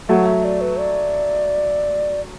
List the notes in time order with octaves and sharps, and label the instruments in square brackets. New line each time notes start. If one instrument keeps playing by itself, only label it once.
[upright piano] F#3 A3 [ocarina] F#5
[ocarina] E5
D5
B4
D5